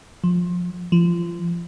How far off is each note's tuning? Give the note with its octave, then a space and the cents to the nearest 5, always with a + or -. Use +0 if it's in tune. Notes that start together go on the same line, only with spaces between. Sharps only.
F3 +20
F3 -25